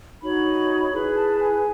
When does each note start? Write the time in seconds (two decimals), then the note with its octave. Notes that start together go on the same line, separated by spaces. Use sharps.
0.22 D#4 F#4 C#5 B5
0.93 E4 G#4 B4 B5
1.15 A5
1.39 G#5